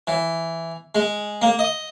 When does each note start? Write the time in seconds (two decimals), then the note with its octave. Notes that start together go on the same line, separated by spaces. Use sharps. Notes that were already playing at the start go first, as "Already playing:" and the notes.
0.07 E3
0.95 G#3
1.42 A#3
1.59 D#5